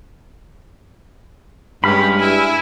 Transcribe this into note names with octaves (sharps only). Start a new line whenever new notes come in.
G2 G#3 C#4 G4 B5 F6
E4 G#5